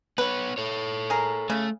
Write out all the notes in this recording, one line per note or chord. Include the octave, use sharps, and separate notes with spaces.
B3 B4 C#5
A4 C#5
G#4 A#4
C#3 A3